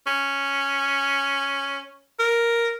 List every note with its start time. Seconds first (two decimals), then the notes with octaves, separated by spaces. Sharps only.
0.07 C#4
2.19 A#4